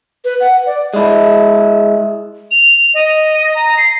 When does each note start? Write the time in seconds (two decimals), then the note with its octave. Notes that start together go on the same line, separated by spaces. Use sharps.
0.24 B4
0.40 F#5
0.66 D5
0.94 G#3 E4
2.51 F7
2.94 D#5
3.55 A#5
3.78 C7